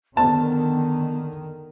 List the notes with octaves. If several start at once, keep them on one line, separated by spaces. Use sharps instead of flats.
D3 D#3 B3 A5